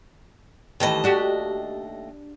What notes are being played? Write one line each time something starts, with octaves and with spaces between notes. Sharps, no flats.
D#2 D#3 E3 A3 D#5
D4 F#4 G4